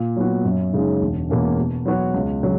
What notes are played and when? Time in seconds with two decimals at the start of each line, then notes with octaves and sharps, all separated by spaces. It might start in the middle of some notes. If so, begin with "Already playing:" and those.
Already playing: A#2
0.16 F#3 B3 F#4
0.45 F#2
0.73 C#3 G#3 D#4
1.01 E1
1.29 E2 B2 A#3 C#4
1.58 B2
1.86 F#3 B3 F#4 C#5
2.14 C#2
2.43 C#3 F#3